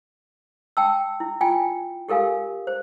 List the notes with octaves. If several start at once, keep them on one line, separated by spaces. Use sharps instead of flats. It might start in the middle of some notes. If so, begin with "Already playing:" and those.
G5 A5 E6
E4
F4 G5 G#5
G4 A4 A#4 F5 G#5
C5